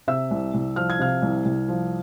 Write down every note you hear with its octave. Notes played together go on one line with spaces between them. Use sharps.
C3 E5 E6
C2
C2
F3 F6
G#6
C3 F5 F6
C2
C2
F3